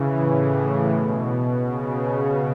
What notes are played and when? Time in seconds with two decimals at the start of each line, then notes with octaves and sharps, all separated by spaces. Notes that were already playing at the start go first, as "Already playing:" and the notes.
Already playing: C#3 E3
0.15 A2
0.91 B2
1.66 C#3